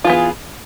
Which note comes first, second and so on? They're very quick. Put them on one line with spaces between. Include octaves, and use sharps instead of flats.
F4 E3 B3 G#4